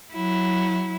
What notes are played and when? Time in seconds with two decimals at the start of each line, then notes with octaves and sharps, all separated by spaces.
0.13 F#3 E4